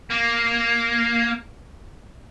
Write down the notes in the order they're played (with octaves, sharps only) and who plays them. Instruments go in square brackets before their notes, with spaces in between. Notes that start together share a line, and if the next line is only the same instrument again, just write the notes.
[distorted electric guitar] A#3